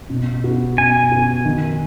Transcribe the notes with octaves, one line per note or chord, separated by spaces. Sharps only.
B2
B3 F#4
B2 G#5
B3 F#4
D#3